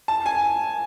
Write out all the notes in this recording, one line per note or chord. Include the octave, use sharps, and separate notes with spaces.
A5
G#5